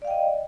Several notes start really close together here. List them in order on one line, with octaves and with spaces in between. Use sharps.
D5 F5 G5 D#5